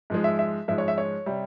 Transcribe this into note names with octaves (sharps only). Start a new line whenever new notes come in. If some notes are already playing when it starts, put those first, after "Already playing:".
G#2 F3 G#3
E5
E5
G#2 F3 G#3 E5
C#5
E5
C#5
C3 G3